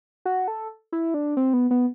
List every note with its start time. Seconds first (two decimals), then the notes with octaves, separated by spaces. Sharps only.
0.25 F#4
0.48 A4
0.92 E4
1.14 D4
1.37 C4
1.53 B3
1.71 B3